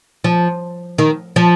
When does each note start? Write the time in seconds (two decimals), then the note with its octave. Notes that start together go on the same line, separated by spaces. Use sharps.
0.24 F3
0.98 D#3
1.36 F3